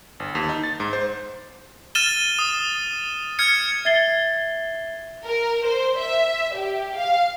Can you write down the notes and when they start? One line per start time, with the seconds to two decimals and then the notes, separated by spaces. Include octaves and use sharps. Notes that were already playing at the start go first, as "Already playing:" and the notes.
0.20 G1
0.35 D#2
0.49 D#4
0.64 A6
0.80 G#2
0.93 C5
1.95 F6 A6 D#7 E7 G7
2.39 D#6
3.39 F6 G#6 C#7
3.85 E5 G#6 A6 C7 G7
5.24 A#4
5.65 C5
5.98 E5
6.55 G4
6.97 F5